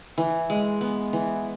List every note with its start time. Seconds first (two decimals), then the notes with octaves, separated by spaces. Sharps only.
0.18 E3
0.50 G#3
0.81 B3
1.13 E3